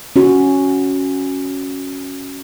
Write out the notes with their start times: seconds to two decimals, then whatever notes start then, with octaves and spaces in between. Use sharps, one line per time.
0.16 C#4 F#4